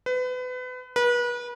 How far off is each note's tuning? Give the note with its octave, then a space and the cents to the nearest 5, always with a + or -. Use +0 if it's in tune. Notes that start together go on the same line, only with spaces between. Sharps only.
B4 +30
B4 -35